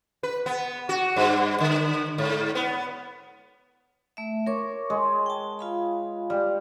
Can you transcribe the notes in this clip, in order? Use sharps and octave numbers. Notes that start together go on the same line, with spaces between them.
B4
B3
F#4
G2
D3
G#2
B3
A3 E5
A#4 C#5 D6
G#3
G5 A5
F4 F5 B5
G3